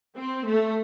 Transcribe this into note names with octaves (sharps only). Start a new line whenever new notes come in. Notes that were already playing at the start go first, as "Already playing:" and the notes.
C4
A3